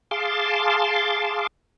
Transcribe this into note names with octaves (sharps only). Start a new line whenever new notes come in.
G#4 F5 A5 C6 D6